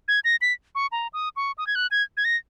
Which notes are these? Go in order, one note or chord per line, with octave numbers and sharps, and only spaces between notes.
G#6
A#6
B6
C#6
A#5
D#6
C#6
D#6
G#6
F#6
G#6
G#6
A#6